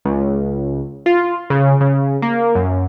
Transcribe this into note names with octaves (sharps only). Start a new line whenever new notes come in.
C#2
F4
C#3
C#3
A#3
F#2